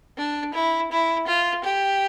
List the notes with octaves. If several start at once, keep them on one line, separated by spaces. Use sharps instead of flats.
D4
E4
E4
F4
G4